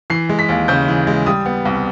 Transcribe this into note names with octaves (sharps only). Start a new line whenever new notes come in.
E3 C7
G#3
B6
D#2
C#3 G6
E3
G#3
G3 D#6
B3
C2